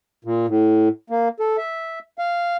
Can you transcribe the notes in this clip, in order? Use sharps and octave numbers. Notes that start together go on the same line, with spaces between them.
A#2
A2
A#3
A4
E5
F5